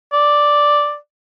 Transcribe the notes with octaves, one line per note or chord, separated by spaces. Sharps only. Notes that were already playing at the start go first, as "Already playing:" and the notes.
D5